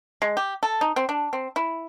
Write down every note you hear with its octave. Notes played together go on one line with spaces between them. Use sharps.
G#3
G4
A4
D#4
C4
D4
C4
E4